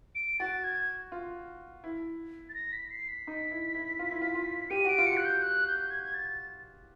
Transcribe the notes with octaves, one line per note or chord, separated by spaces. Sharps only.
D7
F#4 A6
G#6
F4
E4
A6
A#6
B6
C7
B6
D#4
E4
E4
F4
E4
F4
F4
G4 D#7
F#4 D7
F4
C#7
F#4 F#6
G6
F#6
G6
G#6
G#6
A6